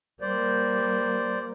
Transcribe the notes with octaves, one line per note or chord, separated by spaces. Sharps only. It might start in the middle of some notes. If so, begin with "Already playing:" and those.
G3 A#3 C5 D5